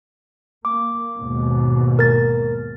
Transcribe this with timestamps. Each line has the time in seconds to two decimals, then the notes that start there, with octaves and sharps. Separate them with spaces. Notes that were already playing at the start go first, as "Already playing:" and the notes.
0.65 A#3 D6
1.18 D#2 G#2 B2
1.99 A#4 A6